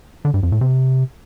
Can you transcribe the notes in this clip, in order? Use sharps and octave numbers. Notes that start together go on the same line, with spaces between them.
D3
G2
F2
A2
C3